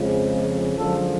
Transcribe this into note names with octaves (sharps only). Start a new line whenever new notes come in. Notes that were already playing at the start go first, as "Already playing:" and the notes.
Already playing: F2 C#3 F3 G#3
F#2 D3 F3 G#3 A4